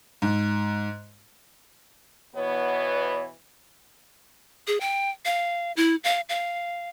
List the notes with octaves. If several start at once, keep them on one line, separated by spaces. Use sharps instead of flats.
G#2
B2 E3 B3 C#5
G#4
G5
F5
E4
F5
F5